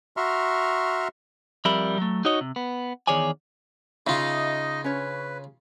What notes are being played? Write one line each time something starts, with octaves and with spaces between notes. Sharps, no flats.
F#4 E5 A#5 C6 C#6 F6
F2 G3 A#4 E5 B5
F#3 A3
D#4 F#4 C#5 D#5
C3
B3
E2 D#3 G#4 C#5 D5 G#5
C#3 D#4 F4 D#5 E5
C#4 B4 C#5